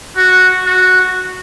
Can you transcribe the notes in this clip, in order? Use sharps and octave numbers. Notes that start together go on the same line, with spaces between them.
F#4
F#4